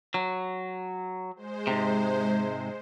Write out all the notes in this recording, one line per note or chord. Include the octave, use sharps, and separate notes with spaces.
F#3
G#3 C5
G#2 C3